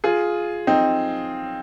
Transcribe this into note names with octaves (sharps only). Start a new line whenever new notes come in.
F4 G#4
C4 D#4